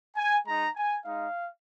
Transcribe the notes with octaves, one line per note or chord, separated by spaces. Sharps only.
G#5
G#3 D#4 A#5
G#5
G#3 D#4 F5